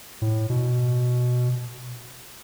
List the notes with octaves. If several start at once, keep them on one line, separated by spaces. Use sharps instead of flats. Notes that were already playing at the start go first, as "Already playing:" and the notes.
A2
B2